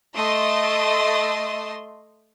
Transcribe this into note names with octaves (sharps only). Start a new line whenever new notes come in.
A3 D#5 C6